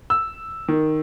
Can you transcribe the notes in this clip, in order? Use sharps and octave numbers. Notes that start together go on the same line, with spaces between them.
E6
D#3